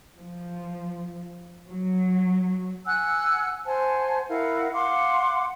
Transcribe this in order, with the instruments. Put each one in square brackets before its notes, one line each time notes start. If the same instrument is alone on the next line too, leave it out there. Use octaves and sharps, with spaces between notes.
[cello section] F3
F#3
[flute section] F#5 G#5 E6 F#6
C5 F#5 G#5 A5
E4 A#4 F5 F#5
F5 F#5 C6 D6